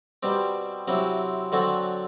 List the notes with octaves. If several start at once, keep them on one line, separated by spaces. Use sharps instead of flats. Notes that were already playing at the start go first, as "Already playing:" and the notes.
B2 G3 C4 G4
C3 F#3 C4 E4
D3 F#3 C4 F#4 A4